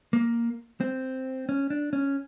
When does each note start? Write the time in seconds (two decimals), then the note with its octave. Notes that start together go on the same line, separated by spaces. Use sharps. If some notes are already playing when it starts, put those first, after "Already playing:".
0.13 A#3
0.81 C4
1.49 C#4
1.70 D4
1.93 C#4